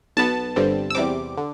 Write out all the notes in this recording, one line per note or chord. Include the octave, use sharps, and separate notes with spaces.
B1 B2 B3 A5
G1 G2 D3 G3 C4
E6
E2 C3 G3 C4 D6
D3